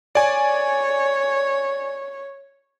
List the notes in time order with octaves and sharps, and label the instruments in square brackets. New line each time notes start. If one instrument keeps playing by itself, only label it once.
[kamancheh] C#5 [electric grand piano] D5 G#5